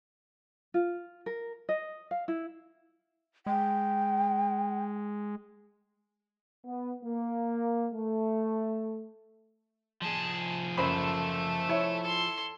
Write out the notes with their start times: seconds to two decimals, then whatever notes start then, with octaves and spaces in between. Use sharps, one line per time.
0.74 F4
1.26 A#4
1.69 D#5
2.11 F5
2.28 E4
3.46 G#3 G5
6.65 B3
7.03 A#3
7.94 A3
10.02 F3 G#4 A5
10.78 F#1 A3 A4 C5 B5
11.69 E4 C#5 E5
12.02 A4 C6